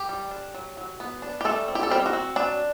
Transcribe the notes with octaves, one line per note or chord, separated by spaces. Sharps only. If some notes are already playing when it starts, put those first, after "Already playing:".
Already playing: G4
G3
D4
F#3
F#3
B3
D4
G4
G3 A3 A4
C4
G4
A4
G3 C4 G4
F#4
C4
F#3 D4 D5